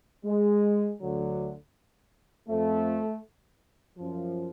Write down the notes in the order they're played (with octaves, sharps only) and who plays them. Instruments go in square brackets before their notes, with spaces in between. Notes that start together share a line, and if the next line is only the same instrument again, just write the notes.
[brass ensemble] G#3
D2 D3 F#3
F2 F3 A3
F#2 F3